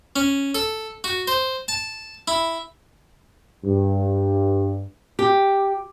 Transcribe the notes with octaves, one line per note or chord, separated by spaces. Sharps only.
C#4
A4
F#4
C5
A5
E4
G2
G4